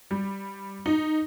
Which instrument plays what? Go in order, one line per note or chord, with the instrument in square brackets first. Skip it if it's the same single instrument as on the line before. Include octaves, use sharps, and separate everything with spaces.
[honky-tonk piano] G3
D#4